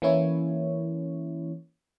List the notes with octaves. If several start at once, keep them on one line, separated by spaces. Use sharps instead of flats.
E3 A#3 C#4 E4 C#5